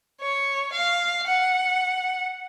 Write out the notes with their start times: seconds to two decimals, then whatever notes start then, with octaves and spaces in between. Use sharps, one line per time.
0.21 C#5
0.73 F5
1.27 F#5